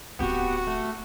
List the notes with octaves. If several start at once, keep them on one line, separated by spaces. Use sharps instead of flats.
D1 B3 C4 F#4 G4
A3